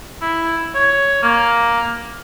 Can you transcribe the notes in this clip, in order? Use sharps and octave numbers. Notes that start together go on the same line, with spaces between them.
E4
C#5
A#3